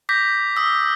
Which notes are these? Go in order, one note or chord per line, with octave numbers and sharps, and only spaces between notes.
D6 G6 A#6 B6
D#6 E6